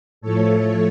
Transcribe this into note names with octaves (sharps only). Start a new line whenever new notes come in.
A2 F3 A3 A4 C#5